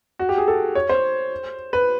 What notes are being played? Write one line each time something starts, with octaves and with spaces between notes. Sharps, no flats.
F#4
G4
G#4
A4
C#5
C5
B4